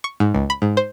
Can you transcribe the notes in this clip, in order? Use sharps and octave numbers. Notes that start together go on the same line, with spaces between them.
C#6
G#2
C#2
B5
G#2
C5